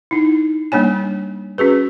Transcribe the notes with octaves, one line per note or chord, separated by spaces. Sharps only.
D#4 E4
G3 A#3 D4 C#5 G#5
C#4 F#4 G#4 B4